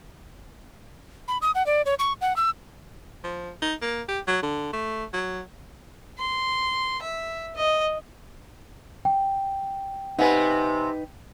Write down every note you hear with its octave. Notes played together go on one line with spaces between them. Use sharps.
B5
D#6
F#5
D5
C#5
C#6
F#5
E6
F3
D#4
A#3
G4
F#3
D3
A3
F#3
C6
E5
D#5
G5
C3 B3 D#4 B4 F#5 G#5 B5